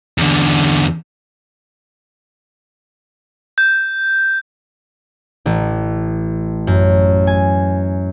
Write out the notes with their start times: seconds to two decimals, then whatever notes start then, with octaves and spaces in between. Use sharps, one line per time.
0.18 E2 D3
3.58 G6
5.46 A1
6.67 F#2
7.27 G#5